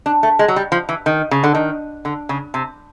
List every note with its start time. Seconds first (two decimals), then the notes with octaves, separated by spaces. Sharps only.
0.06 D4
0.23 A3
0.39 G#3
0.48 F#3
0.56 G3
0.72 F3
0.89 E3
1.06 D#3
1.31 C#3
1.44 D3
1.55 D#3
2.05 D3
2.29 C#3
2.54 C3